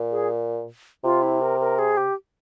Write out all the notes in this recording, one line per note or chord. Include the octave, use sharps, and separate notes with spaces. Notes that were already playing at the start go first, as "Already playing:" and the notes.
Already playing: A#2
G#4
C3 F4
E4
A#4
A#4
G#4
G4